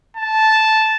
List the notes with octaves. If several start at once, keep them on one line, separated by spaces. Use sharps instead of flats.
A5